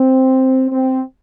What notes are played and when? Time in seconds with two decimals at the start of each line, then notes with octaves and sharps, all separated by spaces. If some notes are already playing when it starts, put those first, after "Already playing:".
Already playing: C4
0.70 C4